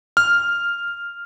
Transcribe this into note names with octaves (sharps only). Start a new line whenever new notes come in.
F6